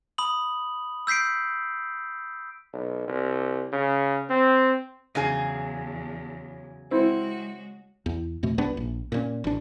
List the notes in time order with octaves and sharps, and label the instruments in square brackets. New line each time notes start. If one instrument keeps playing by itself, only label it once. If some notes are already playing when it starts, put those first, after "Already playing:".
[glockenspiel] B5 D#6 F#7
E6 G6 B6 C7 D7
[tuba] B1
C2
C#3
C4
[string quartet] E2 [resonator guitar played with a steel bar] C#3 F#3 G#4
[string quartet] G#3 F#4 [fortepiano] C4 E4
[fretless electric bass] E2
F2 B2 A3
C2 G2 B3 D4
A#1
A#2 C#3 C#4
A1 D4